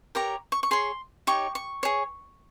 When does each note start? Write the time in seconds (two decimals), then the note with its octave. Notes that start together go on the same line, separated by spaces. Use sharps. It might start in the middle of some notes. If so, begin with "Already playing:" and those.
0.15 G4 A#4 C#5 A#5
0.52 C#6
0.63 C#6
0.71 G#4 C#5 C6
1.27 D#4 G4 C#5 C#6
1.55 C#6
1.83 G#4 C#5